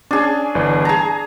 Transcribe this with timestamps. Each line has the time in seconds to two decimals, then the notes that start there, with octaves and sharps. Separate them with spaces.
0.11 C#4 D4 G#4
0.55 G1 E3 D5
0.85 G#4 A5 A#5